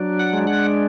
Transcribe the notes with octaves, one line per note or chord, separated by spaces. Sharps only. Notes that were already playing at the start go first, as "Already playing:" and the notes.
Already playing: F#3 D4
F#5
G#3
F#5